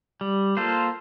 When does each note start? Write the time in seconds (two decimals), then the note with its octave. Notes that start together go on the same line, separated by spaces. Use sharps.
0.21 G3
0.57 A#3 F4 A4 C5